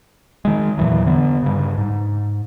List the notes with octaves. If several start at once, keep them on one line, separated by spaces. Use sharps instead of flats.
D#3 G#3
E2 A#2 E3 F#3
D3 B3
G2 C#3
G#2